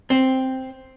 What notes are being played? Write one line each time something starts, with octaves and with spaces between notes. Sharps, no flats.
C4